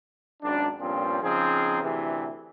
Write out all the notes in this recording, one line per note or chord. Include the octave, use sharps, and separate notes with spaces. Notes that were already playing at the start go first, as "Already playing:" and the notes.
G#1 F#2 D4
G2 A#2 F3 C4 C#4
C#3 F3 C4 D#4 G#4
D2 C3 E3